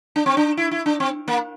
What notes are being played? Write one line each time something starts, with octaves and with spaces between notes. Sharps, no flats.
D4
C4
D4
E4
E4
D4
C4
A#3